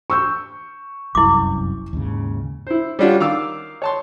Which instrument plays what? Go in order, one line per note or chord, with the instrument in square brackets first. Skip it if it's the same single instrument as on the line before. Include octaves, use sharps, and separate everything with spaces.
[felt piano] C#6 E6 G6
[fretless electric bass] F1 C2 F#2 [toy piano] E4 D6
[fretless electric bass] D#2 G#2 C#3
[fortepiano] E4 C5
G3 C#4 D4 F4 F#4
D#3 F5 D6 E6
C#5 A5 C6